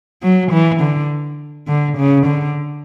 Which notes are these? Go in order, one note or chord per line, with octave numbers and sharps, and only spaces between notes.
F#3
E3
D3
D3
C#3
D3